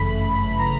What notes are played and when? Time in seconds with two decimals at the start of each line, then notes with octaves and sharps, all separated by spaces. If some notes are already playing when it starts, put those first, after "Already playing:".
Already playing: G1 F#2 C#3 E3 A3 B5
0.58 C#3 E3 A3 A#5